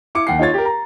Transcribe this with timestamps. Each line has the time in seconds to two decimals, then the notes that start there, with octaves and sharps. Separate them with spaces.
0.15 E4 D6 C#7
0.27 D#2 F#5 G5 C7
0.39 D#4 F4 C#5 A6
0.54 G4 A#4
0.65 A#5